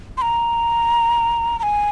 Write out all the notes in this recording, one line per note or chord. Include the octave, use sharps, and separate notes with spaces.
C6
A#5
A#5
G#5